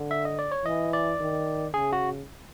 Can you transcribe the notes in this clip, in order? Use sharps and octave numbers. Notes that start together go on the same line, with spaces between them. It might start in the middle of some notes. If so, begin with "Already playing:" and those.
Already playing: D3
E5
D#5
D5
C#5
E3 D#5
D5
D#3
C#3 G#4
F#4